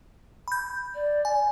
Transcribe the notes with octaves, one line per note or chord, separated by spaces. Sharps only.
B5 G6
D5
G#5